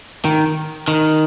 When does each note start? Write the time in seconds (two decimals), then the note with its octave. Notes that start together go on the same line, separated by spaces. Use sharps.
0.25 D#3
0.88 D#3